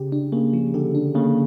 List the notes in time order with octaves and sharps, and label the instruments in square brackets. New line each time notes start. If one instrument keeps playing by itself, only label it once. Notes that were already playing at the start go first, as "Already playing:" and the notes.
Already playing: [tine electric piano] C#3 [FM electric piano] G4
[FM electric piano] D4
[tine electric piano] C#3 [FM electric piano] A#3
[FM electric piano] F3
[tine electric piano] D3 [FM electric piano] G4
[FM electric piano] D4
[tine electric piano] C#3 [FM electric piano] A#3